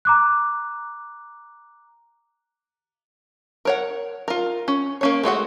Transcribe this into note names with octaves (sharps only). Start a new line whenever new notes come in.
A#5 D6 F#6
A#4 C#5 F#5
F4 A#4
C#4
A#3 C#4 C#5
G#3 A3 F#4 F#5